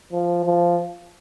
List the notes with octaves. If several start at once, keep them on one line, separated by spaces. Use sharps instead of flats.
F3
F3